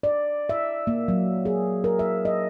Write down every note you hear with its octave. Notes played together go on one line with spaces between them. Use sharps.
D5
E5
A#3
F#3
G#4
A#4
E5
D#5